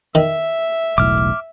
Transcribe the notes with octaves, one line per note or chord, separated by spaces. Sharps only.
D#3 E5
E1 B1 A2 D6 F6